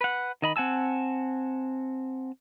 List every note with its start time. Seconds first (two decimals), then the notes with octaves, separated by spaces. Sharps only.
0.01 B4 F#5
0.42 D#3 D#5 B5
0.56 C4 F#5 G#5 A5 E6